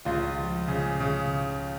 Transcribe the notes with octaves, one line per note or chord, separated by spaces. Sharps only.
C#2 F4
F3
C#3
C#3